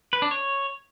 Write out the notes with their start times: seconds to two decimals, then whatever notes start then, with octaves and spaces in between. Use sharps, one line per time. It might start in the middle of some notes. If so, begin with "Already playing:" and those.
0.13 B4
0.22 D4
0.31 C#5